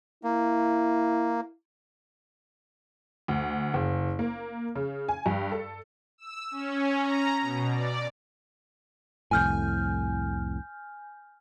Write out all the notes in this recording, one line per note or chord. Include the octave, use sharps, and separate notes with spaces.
A#3 E4
D2
F#1
A#3
C#3
G#5
G2
A4
E6
C#4
A#5
B2
D5
C2 F2 A2 G#5 F6 G6